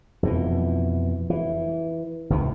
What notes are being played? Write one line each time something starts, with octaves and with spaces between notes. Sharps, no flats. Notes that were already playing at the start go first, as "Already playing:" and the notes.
F2 B2 E3
E3
G#1 C#2 D#3 E3